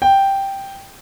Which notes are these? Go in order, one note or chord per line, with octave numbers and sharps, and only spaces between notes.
G5